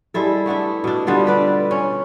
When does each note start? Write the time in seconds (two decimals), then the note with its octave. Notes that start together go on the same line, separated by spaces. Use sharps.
0.14 G3 G#3 E4 A4
0.46 A3 B3 D4 E4
0.84 B2 D4
1.07 D3 G3 B3 F4
1.27 B4 D5
1.71 C#4